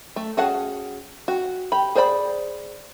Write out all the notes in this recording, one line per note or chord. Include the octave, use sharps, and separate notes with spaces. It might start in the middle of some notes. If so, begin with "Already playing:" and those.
A3
C#4 F#4 G#4 F#5 A5
F#4
G4 B5
G#4 C5 D5 D#5 B5